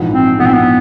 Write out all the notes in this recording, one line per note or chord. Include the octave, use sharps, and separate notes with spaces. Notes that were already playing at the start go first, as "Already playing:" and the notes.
Already playing: A#1 G#2 E3
C4
A#1 G#2 E3 B3
C4
B3